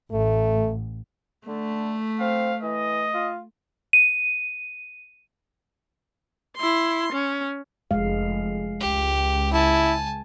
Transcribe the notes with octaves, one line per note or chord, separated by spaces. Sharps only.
A1 A3
D3 A3
C4 F5
E3 D#5
F4
D#7
E4 C6
C#4
F1 G#3 F5
C#2 G4
E4 G#5 A5